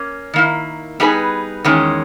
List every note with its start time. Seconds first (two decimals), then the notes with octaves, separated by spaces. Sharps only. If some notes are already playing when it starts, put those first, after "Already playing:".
Already playing: A#3 C#4
0.34 D#3 A#3 E4
1.00 G3 B3 D#4 G#4 B4
1.65 E2 D#3 G#3 C#4